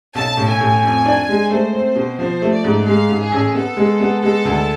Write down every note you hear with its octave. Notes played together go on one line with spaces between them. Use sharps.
B1 A5
A2
G#5
A2
F2
D4
G#3
A3 C5
C4
B2
F3 C5
A3
D5
G#2
G#3 F5
G#2
G#4
A1
B3 A4
G#3
B3
G#3 A4
D2